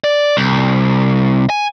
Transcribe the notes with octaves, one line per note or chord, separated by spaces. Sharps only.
D5
C2
G#5